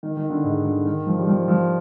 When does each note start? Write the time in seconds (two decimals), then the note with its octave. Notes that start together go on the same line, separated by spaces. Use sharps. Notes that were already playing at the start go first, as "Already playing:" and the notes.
0.03 D#3
0.17 D#3
0.30 D3
0.44 G#2
0.65 D3
0.85 D#3
1.07 F3
1.18 G3
1.27 F3
1.48 F3